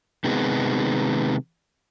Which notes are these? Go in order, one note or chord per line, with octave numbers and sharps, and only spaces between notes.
C3 D#3 G#3 B3